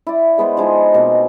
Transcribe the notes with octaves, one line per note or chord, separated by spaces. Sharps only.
E4 D5
G#3 B3 B4 C5
F3 G#3 D#4 D#5
B2 A#3 C4